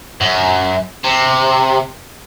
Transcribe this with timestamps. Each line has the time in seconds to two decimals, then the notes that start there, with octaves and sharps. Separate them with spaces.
0.21 F#2
1.04 C3